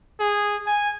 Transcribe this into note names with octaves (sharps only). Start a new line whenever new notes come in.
G#4
G#5